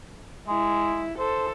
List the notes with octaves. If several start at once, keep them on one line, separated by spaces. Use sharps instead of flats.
G#3 E4
A4 C5